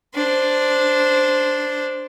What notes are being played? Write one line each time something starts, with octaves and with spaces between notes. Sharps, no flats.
D4 C5